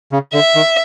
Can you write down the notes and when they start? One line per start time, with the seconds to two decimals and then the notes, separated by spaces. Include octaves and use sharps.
0.12 C#3
0.33 D3 E5
0.55 D#3